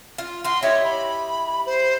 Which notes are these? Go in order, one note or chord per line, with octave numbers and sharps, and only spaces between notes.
F4
F4 F#4 C6
E4 G4 C#5 D#5
B5
C5